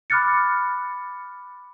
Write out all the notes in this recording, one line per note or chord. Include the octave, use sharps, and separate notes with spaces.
B5 D6 F6 F#6 A6 C#7